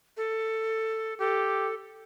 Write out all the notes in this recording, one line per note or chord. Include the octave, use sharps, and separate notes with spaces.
A4
G4 A4